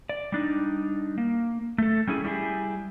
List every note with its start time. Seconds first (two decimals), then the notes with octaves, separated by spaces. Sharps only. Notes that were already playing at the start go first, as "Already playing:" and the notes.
0.09 D5
0.32 G3 D4 D#4
1.18 A#3
1.78 A3 A4
2.07 G3 C#4 E4 G#4
2.24 G3 E4 G4 G#4